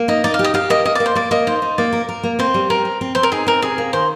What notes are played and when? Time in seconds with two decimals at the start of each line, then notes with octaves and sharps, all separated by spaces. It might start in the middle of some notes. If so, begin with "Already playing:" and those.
Already playing: A#3
0.08 D#4 D#5
0.24 D#4 D5
0.34 F5
0.39 G4
0.44 D#5
0.54 G4 F5
0.70 A#3 D#5
0.85 A#3 D#5
0.95 D5
1.00 A#3
1.06 C5
1.15 A#3 D5
1.31 A#3 D#5
1.47 D#4 C5
1.62 D#4
1.78 A#3 D5
1.92 A#4
2.09 A#4
2.23 A#3
2.39 C4 C5
2.54 G3
2.70 C4 A#4
2.85 C4
3.01 C4
3.15 C4 C5
3.23 A#4
3.32 D#4 G#4
3.47 C4 A#4
3.62 C3 G#4
3.78 A#3
3.93 D#3 C5